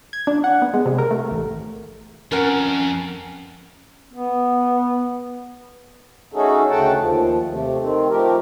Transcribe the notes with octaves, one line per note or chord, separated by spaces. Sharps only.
G#6
D4
F#5
B3
G#3
C3
A#4
A3
A1
F2 C#4 A#4 F#5
B3
A3 C#4 D#4 F#4 G#4 A4
D2 C#3 A3 F#5 G5 A5
D#2 F3
C3 A3
D#3 C4
F3 A3 G4 A#4